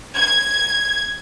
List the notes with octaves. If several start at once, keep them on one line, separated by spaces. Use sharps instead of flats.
G#6